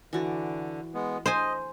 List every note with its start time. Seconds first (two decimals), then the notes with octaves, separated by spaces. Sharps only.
0.13 D3 E3 F#4 D5
0.94 G#3 B3
1.26 C5 D#5 G#5